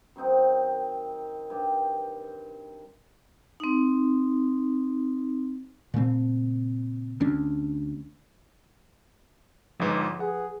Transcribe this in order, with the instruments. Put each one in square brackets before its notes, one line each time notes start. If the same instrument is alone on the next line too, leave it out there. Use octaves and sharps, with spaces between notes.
[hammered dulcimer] F#2 D#3 C4 D#4
G2 G4
[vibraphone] C4 D#4
[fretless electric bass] A#2 C#3 A3 C4
D2 C#4 D4
[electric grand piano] G1 G#2 [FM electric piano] F3 B4
[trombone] G#4 [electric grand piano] F#5